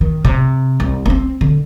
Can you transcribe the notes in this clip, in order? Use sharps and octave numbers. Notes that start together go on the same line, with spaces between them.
D#3
C3
C2
B3 C4
D3